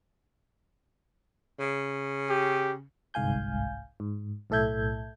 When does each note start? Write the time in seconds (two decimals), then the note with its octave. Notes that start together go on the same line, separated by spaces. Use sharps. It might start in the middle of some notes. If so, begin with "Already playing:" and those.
1.59 C#3
2.30 G4
3.14 G1 C2 G#2 F5 G#5 G6
4.00 G#2
4.50 B1 A2 A4 E5 G6 G#6